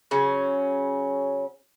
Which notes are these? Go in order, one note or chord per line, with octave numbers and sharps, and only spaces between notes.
C#3 F#3 C#4